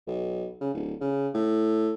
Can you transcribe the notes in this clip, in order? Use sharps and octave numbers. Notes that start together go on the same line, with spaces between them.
B1
C#3
D1
C#3
A2